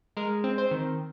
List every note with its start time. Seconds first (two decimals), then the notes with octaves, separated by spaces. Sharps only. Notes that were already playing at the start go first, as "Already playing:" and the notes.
0.17 G#3 A#4
0.44 C4
0.58 C5
0.71 D#3